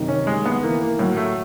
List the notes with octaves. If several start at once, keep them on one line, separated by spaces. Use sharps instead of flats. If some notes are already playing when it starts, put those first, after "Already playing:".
Already playing: F#2 C3 D#3
C#4
G#3
B3
E3 A#3
A#3
A2 F#3
A3